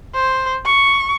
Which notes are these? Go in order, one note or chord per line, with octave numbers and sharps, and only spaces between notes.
C5
C#6